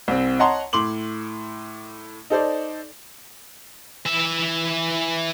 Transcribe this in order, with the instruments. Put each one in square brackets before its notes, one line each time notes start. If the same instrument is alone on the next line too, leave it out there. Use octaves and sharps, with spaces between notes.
[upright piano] C2 C4
C#5 D#5 F#5 A5 A#5 C6
A2 C6 D6 F#7
D#4 A4 C5 D5
[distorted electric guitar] E3 E5